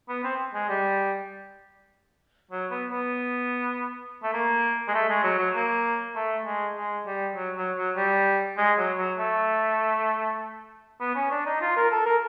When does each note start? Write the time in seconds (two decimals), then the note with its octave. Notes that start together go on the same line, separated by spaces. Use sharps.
0.09 B3
0.24 C4
0.54 G#3
0.68 G3
2.51 F#3
2.71 B3
2.91 B3
4.23 A3
4.33 A#3
4.88 G#3
4.94 A3
5.09 G#3
5.23 F#3
5.39 F#3
5.55 A#3
6.15 A3
6.45 G#3
6.76 G#3
7.06 G3
7.36 F#3
7.57 F#3
7.77 F#3
7.96 G3
8.57 G#3
8.78 F#3
8.98 F#3
9.18 A3
11.00 B3
11.15 C#4
11.31 D4
11.46 D#4
11.61 F4
11.76 A#4
11.91 A4
12.06 A#4